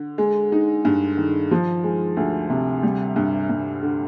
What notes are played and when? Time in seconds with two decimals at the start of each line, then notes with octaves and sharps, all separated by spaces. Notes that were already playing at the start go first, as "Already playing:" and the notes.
Already playing: D3
0.18 G#3
0.52 D#4
0.85 G2
1.17 D#3
1.51 F3
1.83 G#3
2.17 D2
2.50 C3
2.83 G3
3.16 G2
3.49 G2
3.83 D3